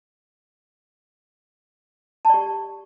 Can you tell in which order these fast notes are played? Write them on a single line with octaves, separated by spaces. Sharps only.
A5 D5 G4